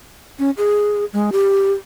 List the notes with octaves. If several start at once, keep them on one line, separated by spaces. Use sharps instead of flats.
C#4
G#4
G#3
G4